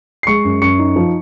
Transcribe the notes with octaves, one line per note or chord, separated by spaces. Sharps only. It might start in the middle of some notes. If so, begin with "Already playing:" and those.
C7
G#3 C#6 C#7
F#2
F#2 C#6 C#7
D#4
F3